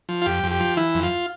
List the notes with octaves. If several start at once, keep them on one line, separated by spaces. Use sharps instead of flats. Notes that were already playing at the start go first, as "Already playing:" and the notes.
F3
F4
F2 G4
F2
G4
F3
E3 E4
F2
F4